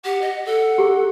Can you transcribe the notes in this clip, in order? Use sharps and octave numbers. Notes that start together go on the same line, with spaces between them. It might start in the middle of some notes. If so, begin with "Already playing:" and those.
G4 F#5
D#5
A4 F#5
G4 G#4